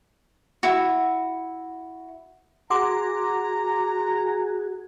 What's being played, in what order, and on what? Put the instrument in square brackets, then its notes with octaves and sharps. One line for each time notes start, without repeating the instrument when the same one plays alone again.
[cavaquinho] E4 F#4
[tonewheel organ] F#4 G#4 [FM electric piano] F#5 C6 D6 [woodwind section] A#5